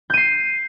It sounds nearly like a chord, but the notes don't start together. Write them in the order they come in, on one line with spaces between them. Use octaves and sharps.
G6 D#7 C7